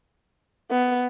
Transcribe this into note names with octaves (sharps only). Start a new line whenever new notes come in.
B3